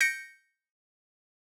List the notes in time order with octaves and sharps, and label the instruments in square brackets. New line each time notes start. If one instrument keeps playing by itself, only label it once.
[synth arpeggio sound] G6 A#6 C#7 D7